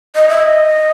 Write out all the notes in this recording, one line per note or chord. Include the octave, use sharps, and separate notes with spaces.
D#5
E5
D#5